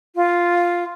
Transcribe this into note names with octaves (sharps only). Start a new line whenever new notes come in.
F4